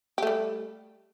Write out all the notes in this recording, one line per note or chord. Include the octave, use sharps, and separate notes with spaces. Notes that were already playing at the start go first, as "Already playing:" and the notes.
G3 A3 G4